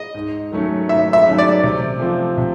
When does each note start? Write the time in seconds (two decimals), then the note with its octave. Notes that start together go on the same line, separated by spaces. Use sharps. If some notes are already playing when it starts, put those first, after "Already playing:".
Already playing: D#5
0.14 G#2
0.52 D#3 F#3 A3 C#4
0.88 G#2 E5
1.13 E5
1.26 D#3 F#3 A3 C#4
1.38 D5
1.63 C3
2.00 F3 A3 C4
2.37 C3